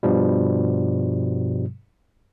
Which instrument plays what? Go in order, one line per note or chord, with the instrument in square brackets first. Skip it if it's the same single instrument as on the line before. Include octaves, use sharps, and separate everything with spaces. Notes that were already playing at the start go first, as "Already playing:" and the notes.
[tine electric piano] G2 B2 F3 G3